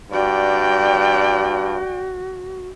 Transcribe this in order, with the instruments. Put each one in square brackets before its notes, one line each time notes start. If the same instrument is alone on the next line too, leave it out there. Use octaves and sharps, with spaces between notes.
[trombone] G2 [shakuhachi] F#4 [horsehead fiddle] D5 G5